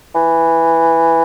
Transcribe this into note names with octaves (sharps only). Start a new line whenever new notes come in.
E3